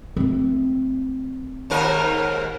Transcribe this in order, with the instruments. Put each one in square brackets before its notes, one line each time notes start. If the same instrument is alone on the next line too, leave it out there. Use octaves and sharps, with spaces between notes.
[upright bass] A3 C4
[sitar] D#2 G#2 A#4